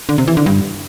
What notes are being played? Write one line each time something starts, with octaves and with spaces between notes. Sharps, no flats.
D3
C3
E3
D3
G2